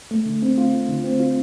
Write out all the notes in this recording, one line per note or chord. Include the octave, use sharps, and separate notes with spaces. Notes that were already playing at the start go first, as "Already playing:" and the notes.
A3
D3
C4
F4
A3
D3
C4
F4